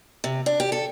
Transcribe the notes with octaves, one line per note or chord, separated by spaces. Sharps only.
C3
D4
G4
A4